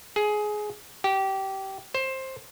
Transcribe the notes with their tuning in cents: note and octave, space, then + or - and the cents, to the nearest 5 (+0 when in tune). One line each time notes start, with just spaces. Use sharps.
G#4 +15
G4 -20
C5 +15